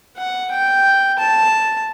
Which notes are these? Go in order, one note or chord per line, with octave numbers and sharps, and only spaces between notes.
F#5
G5
A5